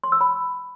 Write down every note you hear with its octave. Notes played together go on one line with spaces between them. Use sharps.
C6
E6
B5